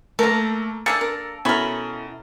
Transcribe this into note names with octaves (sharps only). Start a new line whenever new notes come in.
A3 A#3 A4 A#4 A#5
A#3 D4 G#4 A4 E6 A6 C#7
A#4
B2 C#4 E4 A4 A#4 B5